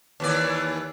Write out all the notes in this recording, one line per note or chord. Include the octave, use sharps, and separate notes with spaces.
D#2 E3 D5